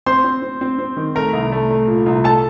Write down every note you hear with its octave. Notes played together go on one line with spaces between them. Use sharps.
C4 C5 C6
C4
C4
C4
C4
D#3
A3 A#4 A#5
C2
A3
A3
A#2
C2
A4 A5